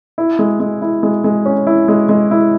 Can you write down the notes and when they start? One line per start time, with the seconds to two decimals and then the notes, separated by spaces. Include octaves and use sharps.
0.18 E4
0.39 G#3
0.60 G#3
0.82 E4
1.03 G#3
1.24 G#3
1.46 C#4
1.67 E4
1.88 G#3
2.09 G#3
2.31 E4